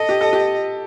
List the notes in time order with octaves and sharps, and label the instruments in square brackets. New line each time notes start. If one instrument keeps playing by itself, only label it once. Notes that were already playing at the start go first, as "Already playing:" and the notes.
Already playing: [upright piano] A4 [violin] D#5
[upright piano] G4
A4
G4